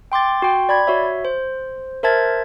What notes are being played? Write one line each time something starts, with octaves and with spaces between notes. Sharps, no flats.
G5 C6 D6 A6
F#4 G5 C6
D5 B5 G#6
F#4 C#5 E5
C5
A#4 C5 E5 A5 G#6 A6